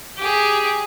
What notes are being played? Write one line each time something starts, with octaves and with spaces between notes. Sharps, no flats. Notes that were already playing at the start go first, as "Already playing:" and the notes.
G4 G#4